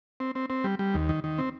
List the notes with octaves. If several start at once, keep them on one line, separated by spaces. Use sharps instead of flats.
C4
C4
C4
G3
G3
D#2
D#3
D#3
C4